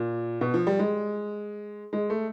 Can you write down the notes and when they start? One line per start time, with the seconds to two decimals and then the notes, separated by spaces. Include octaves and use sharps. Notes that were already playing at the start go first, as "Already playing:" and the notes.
Already playing: A#2
0.41 B2
0.54 F3
0.67 G3
0.79 G#3
1.93 G#3
2.10 A3